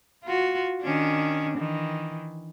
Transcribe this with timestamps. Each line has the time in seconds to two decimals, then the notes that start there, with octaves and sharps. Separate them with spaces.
0.24 F4 F#4
0.82 D#3 C#4 D4
1.57 D#3 E3